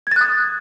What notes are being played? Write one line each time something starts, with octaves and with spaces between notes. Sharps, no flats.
D#6 F#6 G#6 A6